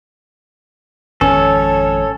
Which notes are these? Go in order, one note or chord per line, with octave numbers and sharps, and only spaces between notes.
G#1 F2 C#4 A4 C#5